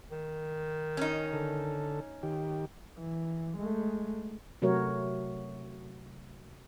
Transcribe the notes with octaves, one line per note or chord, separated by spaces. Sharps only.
D#3
C#4 D#4
D3 A4
D#3 G4
E3
G#3 A3
C3 F#3 A3 F#4 A#4 C#5